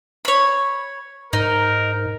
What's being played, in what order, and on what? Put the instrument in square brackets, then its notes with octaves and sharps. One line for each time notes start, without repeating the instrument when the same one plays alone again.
[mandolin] C#5 B5
[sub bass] G#2 [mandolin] D#4 [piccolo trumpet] A#4